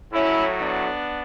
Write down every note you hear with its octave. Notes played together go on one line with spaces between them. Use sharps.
A2 F#3 C#4 E4
B3 D4